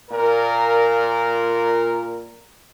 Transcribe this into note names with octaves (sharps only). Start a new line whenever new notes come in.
A#2 A#4